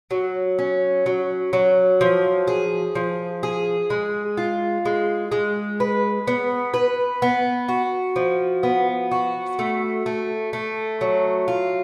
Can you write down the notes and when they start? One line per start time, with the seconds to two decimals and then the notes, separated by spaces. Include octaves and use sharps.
0.11 F#3
0.59 C#4
1.06 F#3
1.53 F#3
2.01 F3
2.48 G#4
2.95 F3
3.43 G#4
3.90 G#3
4.37 F4
4.85 G#3
5.32 G#3
5.80 B4
6.28 B3
6.74 B4
7.22 B3
7.68 F#4
8.16 F3
8.63 B3
9.11 F#4
9.59 A3
10.06 A3
10.53 A3
11.01 F#3
11.48 F4